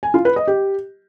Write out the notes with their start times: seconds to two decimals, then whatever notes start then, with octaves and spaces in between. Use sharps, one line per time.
0.03 G#5
0.14 F4
0.25 B4
0.36 D#5
0.47 G4